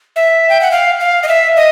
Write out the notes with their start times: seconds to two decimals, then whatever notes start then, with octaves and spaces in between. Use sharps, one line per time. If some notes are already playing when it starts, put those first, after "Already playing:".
0.16 E5
0.49 G5
0.61 F#5
0.72 F5
1.00 F5
1.23 D#5
1.28 E5
1.57 D#5